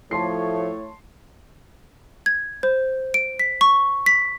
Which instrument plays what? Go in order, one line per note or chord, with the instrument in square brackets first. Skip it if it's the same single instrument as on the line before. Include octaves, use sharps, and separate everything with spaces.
[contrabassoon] A2 [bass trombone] F3 [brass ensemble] A3 C#5 [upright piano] A5 C6 C7
[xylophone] G#6
C5
D7
B6
C#6
B6